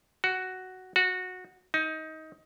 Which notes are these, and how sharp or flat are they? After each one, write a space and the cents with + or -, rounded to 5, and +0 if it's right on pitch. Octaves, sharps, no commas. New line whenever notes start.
F#4 +5
F#4 -15
D#4 +20